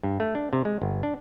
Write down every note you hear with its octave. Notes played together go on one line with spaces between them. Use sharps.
G2
A3
D4
C3
G#3
G1
D4